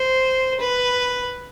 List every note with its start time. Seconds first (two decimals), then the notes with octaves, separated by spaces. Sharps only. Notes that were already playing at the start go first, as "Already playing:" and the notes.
Already playing: C5
0.60 B4